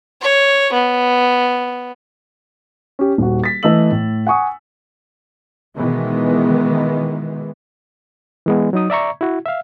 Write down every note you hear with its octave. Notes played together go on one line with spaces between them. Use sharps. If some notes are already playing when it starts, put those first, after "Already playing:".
C#5
B3
C#4 G4
D#1 F#4
A6 B6
E3 A3 D#5 E6 F#7
A2
F#5 G#5 C#6 D#6
B2 D#3 E3 G#3 B3
E3 G#3 B3
F#3 D#4 D#6
D5 E5 A#5 C#6
E4 F#4
E5 F5